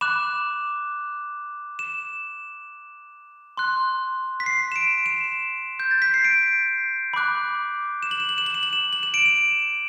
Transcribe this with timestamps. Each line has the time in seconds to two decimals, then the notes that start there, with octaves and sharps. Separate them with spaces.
0.01 B5 D6 F#6 E7
1.79 E7
3.57 C6 F#6
4.40 B6
4.46 C7
4.72 E7
4.76 D7
5.06 E7
5.80 G6
5.91 A6
6.02 B6
6.14 C7
6.24 D7
7.14 B5 D6 F#6
8.03 E7
8.11 F#7
8.20 E7
8.29 F#7
8.38 E7
8.46 F#7
8.54 E7
8.63 F#7
8.73 E7
8.93 F#7
9.03 E7
9.14 D7
9.26 E7